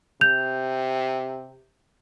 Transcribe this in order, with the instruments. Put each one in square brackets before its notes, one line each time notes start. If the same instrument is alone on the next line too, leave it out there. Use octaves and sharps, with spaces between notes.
[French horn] C3 [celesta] G6 F7